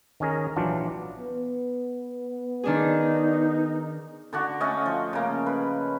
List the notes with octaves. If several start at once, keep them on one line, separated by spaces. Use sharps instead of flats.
D#3 C#4 G#4 A#4
A#1 E3 F#3 D4 F4 G4
B3
D#3 D4 D#4 G#4
D3 D4 F#4
A3 C#4 D#5
F3
C#3 A#3
B4